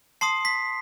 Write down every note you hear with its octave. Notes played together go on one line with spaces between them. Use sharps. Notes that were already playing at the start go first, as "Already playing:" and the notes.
A5 C6 D#6 C7
B6